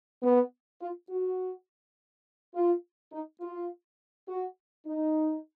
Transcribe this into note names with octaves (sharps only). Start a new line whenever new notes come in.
B3
F4
F#4
F4
D#4
F4
F#4
D#4